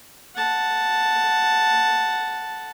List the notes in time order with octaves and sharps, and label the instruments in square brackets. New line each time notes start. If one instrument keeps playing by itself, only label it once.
[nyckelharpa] F#5 A5